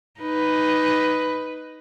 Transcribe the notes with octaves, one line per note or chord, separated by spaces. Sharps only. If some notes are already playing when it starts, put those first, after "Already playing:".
D#4 B4